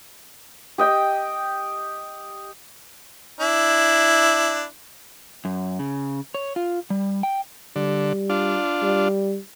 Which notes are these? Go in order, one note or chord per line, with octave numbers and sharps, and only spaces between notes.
G4 D#5 G5
D4 E4
F#2
C#3
C#5
F4
G3
G5
D3 G3
D4 F4
G3